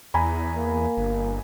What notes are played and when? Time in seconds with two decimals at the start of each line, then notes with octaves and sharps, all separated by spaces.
0.14 E2 G#5 A#5 B5
0.56 A#3
0.97 G1